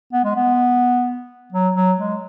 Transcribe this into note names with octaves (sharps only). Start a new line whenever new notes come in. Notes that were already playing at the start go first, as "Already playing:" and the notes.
B3
G#3
B3
F#3
F#3
G#3